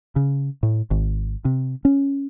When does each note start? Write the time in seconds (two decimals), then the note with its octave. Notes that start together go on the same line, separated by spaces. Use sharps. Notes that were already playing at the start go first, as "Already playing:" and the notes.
0.16 C#3
0.63 A2
0.91 G#1
1.45 C3
1.85 C#4